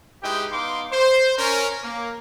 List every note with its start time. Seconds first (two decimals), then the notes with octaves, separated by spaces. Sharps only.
0.22 G#3 D#4 E4 G4 B4 G5
0.51 B3 D#4 F5 C6 D6
0.92 C5
1.38 C#4 A#4
1.83 A#3